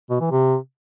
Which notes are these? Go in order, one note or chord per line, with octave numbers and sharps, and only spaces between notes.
B2
E3
C3